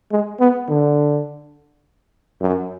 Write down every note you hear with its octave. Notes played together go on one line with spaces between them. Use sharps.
G#3
B3
D3
F#2